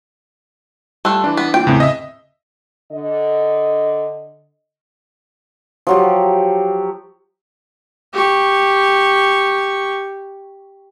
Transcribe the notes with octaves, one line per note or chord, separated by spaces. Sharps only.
G3 A3 F4 E6 F#6
E3 D4
B3
A#3 F4 G5
E2 A2 C#3 C4
D#5 E5
D3 D#5
F3 F#3 G4
G4 C#6